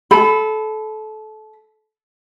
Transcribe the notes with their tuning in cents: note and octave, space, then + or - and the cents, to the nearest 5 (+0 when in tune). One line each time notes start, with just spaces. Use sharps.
A4 -25 B5 +20